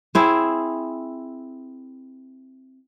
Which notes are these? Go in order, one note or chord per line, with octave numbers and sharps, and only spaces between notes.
C4 E4 G#4